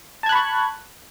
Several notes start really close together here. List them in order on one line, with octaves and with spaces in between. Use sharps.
A5 G#6 F#6 B5 C#6